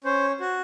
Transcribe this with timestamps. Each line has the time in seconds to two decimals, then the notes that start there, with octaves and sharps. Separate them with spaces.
0.04 C#4 C5
0.40 F#4